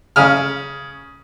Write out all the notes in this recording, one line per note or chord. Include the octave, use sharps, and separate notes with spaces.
C#3 F6